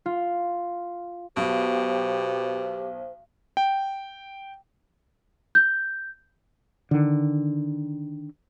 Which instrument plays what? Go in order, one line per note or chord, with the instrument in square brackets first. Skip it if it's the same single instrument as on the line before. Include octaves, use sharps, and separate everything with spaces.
[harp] F4
[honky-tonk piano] B1 B3 [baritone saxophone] B2 [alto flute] G4 [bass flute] C5
[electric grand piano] G5
[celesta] G6
[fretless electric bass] D3 D#3